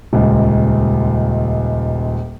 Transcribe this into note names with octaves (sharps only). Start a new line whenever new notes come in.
D#1 C#2